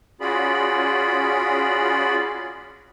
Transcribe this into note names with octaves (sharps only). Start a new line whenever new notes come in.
C#4 F4 F#4 G#4 D5 B5